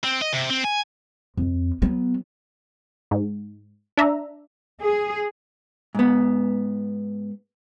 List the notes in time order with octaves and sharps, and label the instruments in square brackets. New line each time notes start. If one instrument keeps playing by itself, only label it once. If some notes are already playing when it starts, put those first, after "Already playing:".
[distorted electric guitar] C4
D#5
C3
C4
G#5
[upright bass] F2
F#3 B3
[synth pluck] G#2
D4 E5 A#5
[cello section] G#4
[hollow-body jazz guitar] G#2 B3